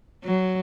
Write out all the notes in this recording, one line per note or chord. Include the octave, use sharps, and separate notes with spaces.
F#3